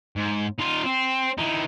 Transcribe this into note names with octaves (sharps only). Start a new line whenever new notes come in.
G#2
D#4 F4
C4
E3 D#4